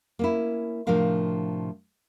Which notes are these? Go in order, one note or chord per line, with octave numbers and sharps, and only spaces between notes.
A#3 C#4 E4
A2 C3 F3 D4 A#4 F5